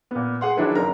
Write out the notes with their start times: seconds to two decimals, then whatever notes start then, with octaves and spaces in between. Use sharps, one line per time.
0.11 A#2 B3
0.41 G#4 F#5 C6
0.57 D#3 F#3 D4 E4 G#4 B4
0.75 F#1 A#4 A#5